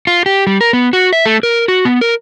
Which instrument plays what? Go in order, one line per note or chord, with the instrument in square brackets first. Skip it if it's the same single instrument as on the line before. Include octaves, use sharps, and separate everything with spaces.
[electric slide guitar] F4
G4
G3
A#4
B3
F#4
E5
A3
A#4
F#4
B3
A#4